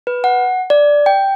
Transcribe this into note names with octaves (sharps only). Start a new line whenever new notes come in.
B4
F#5
D5
G5